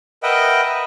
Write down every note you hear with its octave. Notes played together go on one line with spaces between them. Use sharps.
A#4 B4 D#5 E5 F#5 G5